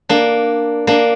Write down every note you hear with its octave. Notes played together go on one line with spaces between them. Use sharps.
A#3 D4
A#3 D4